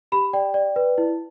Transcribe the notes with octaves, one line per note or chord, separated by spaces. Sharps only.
G4 B5
D5 G5
D5
B4
E4